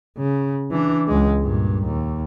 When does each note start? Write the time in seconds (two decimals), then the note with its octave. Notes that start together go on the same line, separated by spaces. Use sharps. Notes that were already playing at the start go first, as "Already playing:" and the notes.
0.18 C#3
0.71 E3 D4
1.07 C#2 G#3
1.40 G2 A#2
1.86 D#2